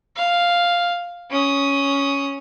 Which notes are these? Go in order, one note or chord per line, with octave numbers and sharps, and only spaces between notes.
F5
C#4 D#6